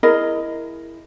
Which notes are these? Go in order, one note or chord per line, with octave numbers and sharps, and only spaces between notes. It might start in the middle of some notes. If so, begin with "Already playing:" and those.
E4 G#4 A#4 D#5